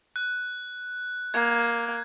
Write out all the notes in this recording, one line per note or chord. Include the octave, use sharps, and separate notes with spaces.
F#6
A#3 G#6